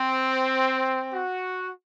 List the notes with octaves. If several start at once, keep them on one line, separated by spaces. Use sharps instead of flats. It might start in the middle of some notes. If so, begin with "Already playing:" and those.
Already playing: C4
F#4